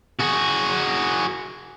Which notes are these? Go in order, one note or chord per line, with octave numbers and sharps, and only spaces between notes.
F#4 G#4